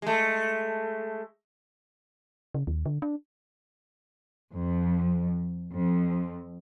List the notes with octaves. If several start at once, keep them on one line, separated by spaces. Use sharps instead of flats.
G#3 A3
C#3
D#2
D3
D4
F2
F2